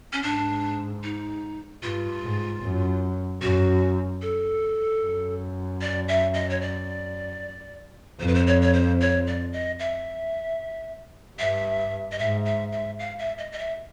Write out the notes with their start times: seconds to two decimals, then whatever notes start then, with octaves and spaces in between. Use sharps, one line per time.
0.13 C#4
0.23 G#2 D4
1.03 D#4
1.83 G2 F4
2.23 G#2
2.63 F#2
3.42 F#2 F#4
4.22 A4
5.02 F#2
5.81 D5
6.08 E5
6.34 D#5
6.50 C#5
6.61 D5
8.20 F2 C5
8.27 B4
8.35 C5
8.47 C#5
8.61 C#5
8.74 C5
9.01 C#5
9.27 D5
9.53 D#5
9.79 E5
11.39 G2 E5
12.12 D#5
12.19 G#2 E5
12.45 E5
12.72 E5
12.99 F5
13.19 E5
13.38 D#5
13.52 D#5
13.59 E5